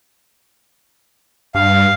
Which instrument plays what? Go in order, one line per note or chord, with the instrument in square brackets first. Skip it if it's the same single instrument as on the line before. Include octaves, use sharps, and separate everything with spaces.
[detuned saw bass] G2 [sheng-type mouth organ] F5